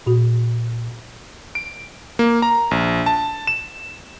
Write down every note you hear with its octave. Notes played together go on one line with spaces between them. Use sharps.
A#2 F#4
D7
A#3
A#5
A#1
A5
E7